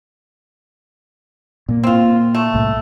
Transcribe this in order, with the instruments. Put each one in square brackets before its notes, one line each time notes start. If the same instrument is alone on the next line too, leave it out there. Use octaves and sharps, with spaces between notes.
[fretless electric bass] A#2 A#3
[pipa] C4 F4
A3
[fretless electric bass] C2 A2